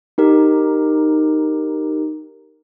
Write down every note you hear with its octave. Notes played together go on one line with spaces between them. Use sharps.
D#4 G4 A#4